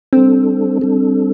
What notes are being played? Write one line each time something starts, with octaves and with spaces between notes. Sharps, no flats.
G3 C4 D4 A4
G3 D4 A4